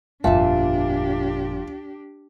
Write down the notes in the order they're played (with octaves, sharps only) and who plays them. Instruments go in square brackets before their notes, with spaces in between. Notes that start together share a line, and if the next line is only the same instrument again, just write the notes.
[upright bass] G1 F2 [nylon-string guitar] A#2 E5 A5 [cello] D4 G4 [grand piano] F4